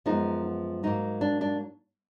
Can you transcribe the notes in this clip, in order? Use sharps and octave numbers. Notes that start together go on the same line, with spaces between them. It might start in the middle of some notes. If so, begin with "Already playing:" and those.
F#2 F3 G#3 B3 D#4
G#2 F#3 A#3 D#4
D4
D4